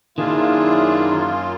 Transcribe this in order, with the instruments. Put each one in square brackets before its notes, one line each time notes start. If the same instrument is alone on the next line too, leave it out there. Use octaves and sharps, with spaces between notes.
[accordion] F#2 A#3 F4 [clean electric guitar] D#3 [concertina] D4 G#4 [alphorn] E4